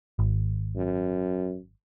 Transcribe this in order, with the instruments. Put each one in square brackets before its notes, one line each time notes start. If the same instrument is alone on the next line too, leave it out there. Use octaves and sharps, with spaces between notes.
[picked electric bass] G#1
[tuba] F#2